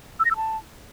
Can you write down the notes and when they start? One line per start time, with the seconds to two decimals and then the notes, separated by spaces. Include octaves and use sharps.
0.20 E6
0.25 A#6
0.31 E6
0.36 A5